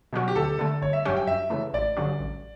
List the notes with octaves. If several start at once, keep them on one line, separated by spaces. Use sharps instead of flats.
B2 F#3 C#4 F#4
G4
D2 A4
D3 A3
G1 C#5
E5
G2 F#3 C#4 G4
G5
F#2 E5
C#3 E3 A3
A1 D5
G2 D3 F#3 C#4
A1